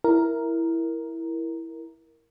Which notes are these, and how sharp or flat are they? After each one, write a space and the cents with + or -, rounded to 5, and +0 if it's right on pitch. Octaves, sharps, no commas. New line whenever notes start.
E4 +0 A#4 +0